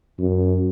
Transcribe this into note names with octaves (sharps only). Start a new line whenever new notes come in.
F#2